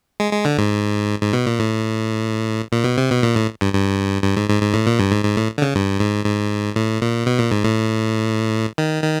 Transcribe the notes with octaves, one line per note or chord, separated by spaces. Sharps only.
G#3
G#3
D3
G#2
G#2
B2
A#2
A2
A#2
B2
C3
B2
A#2
A2
G2
G2
G2
G#2
G#2
G#2
A2
A#2
G2
G#2
G#2
A2
D3
C#3
G2
G#2
G#2
A2
A#2
B2
A#2
G#2
A2
D#3
D#3